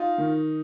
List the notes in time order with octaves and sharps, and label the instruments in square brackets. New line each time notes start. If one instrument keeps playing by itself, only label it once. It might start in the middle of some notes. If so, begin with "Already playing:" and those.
Already playing: [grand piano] D#4 [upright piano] F4
[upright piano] D#3